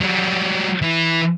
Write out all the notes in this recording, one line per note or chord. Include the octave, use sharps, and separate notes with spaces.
F#3 G3
E3 E4